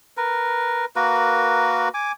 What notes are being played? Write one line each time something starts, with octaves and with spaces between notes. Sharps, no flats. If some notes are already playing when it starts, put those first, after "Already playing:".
A#4 B4
A#3 F#4 A#4 B4
G#5 D6